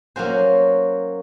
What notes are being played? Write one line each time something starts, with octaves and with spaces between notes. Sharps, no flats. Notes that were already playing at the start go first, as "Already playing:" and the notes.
F#3 A#3 C#4 F#4 C5